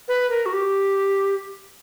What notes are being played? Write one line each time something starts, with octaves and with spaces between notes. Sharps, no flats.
B4
A#4
F#4
G4